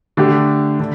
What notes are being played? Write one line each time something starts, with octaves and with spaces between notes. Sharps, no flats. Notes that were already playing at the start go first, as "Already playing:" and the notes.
D3 A3 D4 G4
D3